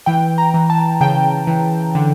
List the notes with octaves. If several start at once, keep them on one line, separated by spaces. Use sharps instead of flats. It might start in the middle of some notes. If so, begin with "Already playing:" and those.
E3 G5
A#5
E3
A5
C#3 G5
E3
D3